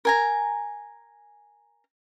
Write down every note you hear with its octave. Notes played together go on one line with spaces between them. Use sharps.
A#4 G#5 A#5